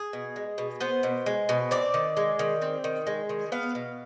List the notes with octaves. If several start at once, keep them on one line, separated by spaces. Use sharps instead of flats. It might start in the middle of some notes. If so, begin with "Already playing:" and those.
Already playing: G#4
B2
G#3
B2
B3 C5
B2
G#3
B2
C4 D5
D#3
G#3
D#3
C4
D#3
G#3
D#3
B3 F5
B2